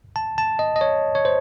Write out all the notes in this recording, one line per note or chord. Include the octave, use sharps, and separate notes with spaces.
A5
A5
D#5
D#5
C#5
C#5
C5